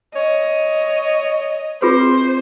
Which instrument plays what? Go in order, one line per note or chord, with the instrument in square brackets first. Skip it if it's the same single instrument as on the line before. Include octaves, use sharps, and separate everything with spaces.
[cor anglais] C#5 [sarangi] D#5
[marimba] C4 [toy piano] F4 G#4 B4 [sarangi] C5